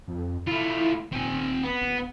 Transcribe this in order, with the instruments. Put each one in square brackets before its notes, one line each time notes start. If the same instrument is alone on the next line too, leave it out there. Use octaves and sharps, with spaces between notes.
[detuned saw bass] F2
[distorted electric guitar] A3 F4 [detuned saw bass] E4
[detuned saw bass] D#1 [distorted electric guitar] C4 G#5
[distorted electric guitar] B3
[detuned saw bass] D#1